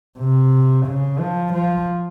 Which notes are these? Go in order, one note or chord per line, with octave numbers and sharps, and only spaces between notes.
C3
C#3
F3
F3